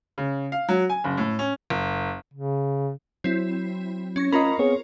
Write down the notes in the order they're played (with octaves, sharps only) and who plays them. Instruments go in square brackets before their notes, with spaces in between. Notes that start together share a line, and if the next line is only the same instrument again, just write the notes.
[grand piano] C#3
F5
F#3
G#5
F#1
A2
C#4
F#1
[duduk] C#3
[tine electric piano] F#3 [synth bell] C4 E4
[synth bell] C#4 C#6 A#6
[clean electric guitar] D2 C#4 [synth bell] F4 A#4 [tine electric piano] D#5 A#5 B5
[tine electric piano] B3 C4 G#4 [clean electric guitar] C#5